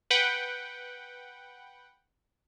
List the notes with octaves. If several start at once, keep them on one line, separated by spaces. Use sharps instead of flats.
B4 F#5 G5